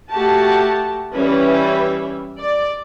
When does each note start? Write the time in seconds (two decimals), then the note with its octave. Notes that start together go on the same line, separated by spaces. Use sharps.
0.10 A3 F#4 G4 A5
1.14 E3 G3 C#4 B4 E5
2.39 D5